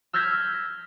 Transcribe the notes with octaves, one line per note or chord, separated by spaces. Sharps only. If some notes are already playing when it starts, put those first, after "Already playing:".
E6 F6 G6 G#6 A#6 B6